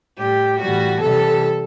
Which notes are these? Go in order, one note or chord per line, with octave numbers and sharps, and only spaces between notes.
A2 G3 G4
A2 E3 G3 F#4
C3 E3 G3 A4